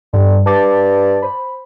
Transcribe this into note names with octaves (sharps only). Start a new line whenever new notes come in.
G2 D3 G3
G2 A5 D6 A6
C5 B5